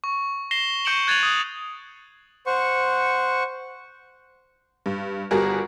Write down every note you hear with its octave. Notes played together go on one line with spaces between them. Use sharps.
C#6
A#6 C7 E7 G7
C#6 G6 C#7 D7 E7 F#7
F#6 G#6 A6 D#7 F7 F#7
D#6
C5 F#5 C#6
G2
G1 G3 F#4 G#4 A#4